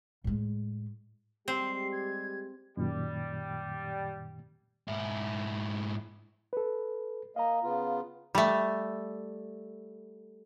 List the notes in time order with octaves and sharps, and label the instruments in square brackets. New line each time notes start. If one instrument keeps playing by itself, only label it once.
[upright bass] A2 G#3
[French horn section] G3 G#3 G4 [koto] C4 [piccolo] C7
[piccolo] G#6
[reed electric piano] F#2 A#2 D#3 [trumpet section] G3
[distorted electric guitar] G#2 E4
[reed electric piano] A4 B4
[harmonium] A#3 D#5 [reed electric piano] F5 A#5
[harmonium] C#3 B3 F4
[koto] G3 A3